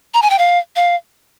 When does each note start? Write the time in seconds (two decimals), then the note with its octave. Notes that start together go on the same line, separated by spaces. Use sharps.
0.14 A#5
0.22 G#5
0.30 G5
0.39 F5
0.76 F5